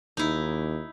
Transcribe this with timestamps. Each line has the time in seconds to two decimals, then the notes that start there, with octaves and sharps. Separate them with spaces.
0.17 D#2 D#4 E4